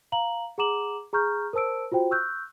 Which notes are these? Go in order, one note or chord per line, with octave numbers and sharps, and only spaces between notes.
F5 A#5 F#7
G#4 F#5 A#5 D6 E7 F#7
G#4 A#5 C#6 F6 G6
A#4 C5 A5 E6 D7
F4 F#4 C5 G5
C#6 E6 F#6 G6